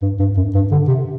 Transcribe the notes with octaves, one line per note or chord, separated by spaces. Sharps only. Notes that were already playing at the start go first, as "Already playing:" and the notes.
G2
G2
F#2
G2
D3
C3